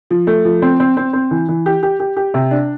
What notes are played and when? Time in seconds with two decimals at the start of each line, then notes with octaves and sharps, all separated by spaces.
0.10 F3
0.27 A3
0.45 F3
0.62 C4
0.80 C4
0.97 C4
1.13 C4
1.31 E3
1.49 E3
1.66 G4
1.83 G4
2.00 G4
2.17 G4
2.34 C3
2.51 D4